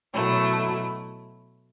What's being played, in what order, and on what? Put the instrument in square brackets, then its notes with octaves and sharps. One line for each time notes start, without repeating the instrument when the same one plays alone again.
[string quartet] B2 F#3 A3 E4